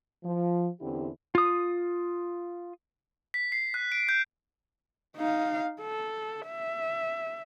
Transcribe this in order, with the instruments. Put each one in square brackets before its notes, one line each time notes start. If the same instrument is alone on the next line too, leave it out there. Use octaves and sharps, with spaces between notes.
[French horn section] F3
E2 D3 C4 C#4 E4 G4
[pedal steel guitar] F4 D#6
[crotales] B6
C7
F#6
D7
G6
[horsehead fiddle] D#4 F5
A4
E5